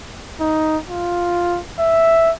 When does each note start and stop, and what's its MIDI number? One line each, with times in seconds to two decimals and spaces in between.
0.40 0.78 63
0.89 1.60 65
1.79 2.32 76